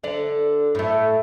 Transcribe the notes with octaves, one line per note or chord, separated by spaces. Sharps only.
D3 D5
A2 A3